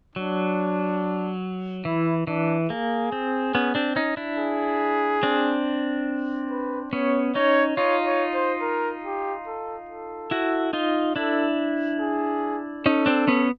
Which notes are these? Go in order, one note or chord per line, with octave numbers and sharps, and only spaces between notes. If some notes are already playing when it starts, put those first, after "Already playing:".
F#3 D4
E3 E4
E3 D4
A#3 G#4
C4
B3 C#4
C4 D4
C#4 D#4
D4 E4
G#4
C4 D4
B4
B3 C#4 C#5
C#4 D#4 C#5
D#4 F4 C#5
C#5
C5
A#4
G4
A4
A4
E4 F#4
D#4 F4
D4 E4 A4
G#4
C#4 D#4 A4
C4 D4
B3 C#4